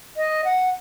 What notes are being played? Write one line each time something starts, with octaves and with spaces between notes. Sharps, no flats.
D#5
F#5